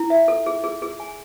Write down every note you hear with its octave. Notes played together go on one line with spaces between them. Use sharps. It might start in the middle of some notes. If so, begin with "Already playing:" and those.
Already playing: E4
E5
A4
G#4
G#4
G#4
G#5